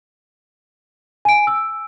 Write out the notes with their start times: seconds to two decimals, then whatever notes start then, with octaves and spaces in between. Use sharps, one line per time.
1.25 G#5 D7
1.47 E6